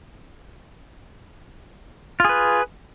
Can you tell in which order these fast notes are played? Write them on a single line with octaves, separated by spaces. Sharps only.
F4 G#4 B4